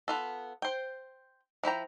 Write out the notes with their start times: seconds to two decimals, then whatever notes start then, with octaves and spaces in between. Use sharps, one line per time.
0.08 B3 F4 A4
0.62 C5 G5
1.63 F3 E4 G5 A#5